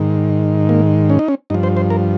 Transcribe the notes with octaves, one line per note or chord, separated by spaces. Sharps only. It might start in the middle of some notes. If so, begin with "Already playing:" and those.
Already playing: G#2 D#3
A#3
C#4
D#4
C#4
G2 F3 D#4
C5
C5
A#4